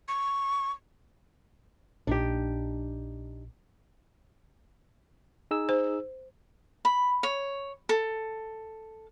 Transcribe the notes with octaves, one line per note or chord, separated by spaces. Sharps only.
C#6
A#1 D4 D#4 G4
D#4 G#4 E6
C5
B5
C#5
A4